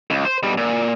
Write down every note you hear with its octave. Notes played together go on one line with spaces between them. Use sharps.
C#2
C5
B2 G3
A#2